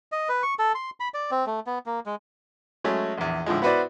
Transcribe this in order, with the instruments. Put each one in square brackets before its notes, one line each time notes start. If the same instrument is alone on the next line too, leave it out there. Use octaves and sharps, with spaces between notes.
[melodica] D#5
B4
C#6
A4
C6
B5
D5
C4
A3
B3
A#3
G#3
[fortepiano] F#3 G#3 A3 C#4
A#1 E2
A2 D3 F3 G#3
B3 E4 F#4 B4 C5 D5